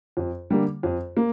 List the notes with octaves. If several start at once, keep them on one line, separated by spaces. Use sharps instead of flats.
F2
D3 G3 A#3
F2
A#3